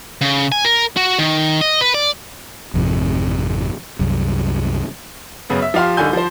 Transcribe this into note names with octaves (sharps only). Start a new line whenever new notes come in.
C#3
G#5
A#4
F#4
D#3
D#5
B4
D5
G#1 F2 C3
C2 F#2
F#2 C#3 B3
E5
F3 G4 F5 C6
C2 D3 D#4 G#5 G6
F3 C5